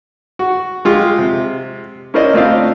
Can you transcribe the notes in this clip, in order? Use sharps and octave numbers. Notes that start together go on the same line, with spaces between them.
F#4
G#3 F4 G4
C3
C#4 E4 A#4 C5 D5 D#5
A3 C4 D4 F4 D#5 F5